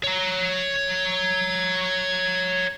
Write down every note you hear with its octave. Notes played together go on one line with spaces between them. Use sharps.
C#5 A#5